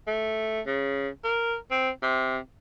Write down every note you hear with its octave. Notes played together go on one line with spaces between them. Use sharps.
A3
C#3
A#4
C4
C3